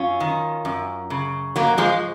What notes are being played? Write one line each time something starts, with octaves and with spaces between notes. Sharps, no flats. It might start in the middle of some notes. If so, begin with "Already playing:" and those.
Already playing: F#2 C#4 F4
D#3
F#2
C#3
G#2 F#3 A#3
F3 G#3